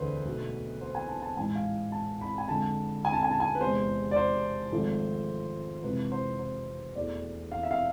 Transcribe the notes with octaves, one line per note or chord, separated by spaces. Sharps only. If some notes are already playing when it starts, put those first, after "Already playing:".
Already playing: E1 D2 D3 B4 C5
B1 B2 A3
C5
G#5
A5
A5
A1 G#2 G#3 G#5
F5
A5
B5
G#5
F2 D3 G#3 A5
G#5
A5
G#5
A5
G#5
B4
E2 C3 G#3 C5
D5
C5
G#1 G#2 F3 A3
F1 F2 C3 E3 G#3 B4
C5
C5
E1 E2 B2 A3 D5
F5
E5
F5